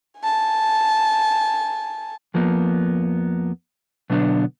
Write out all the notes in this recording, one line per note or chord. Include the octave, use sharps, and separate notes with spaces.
G#5 A5
F2 F3 A#3 B3
B2 D3 F#3 B3 D4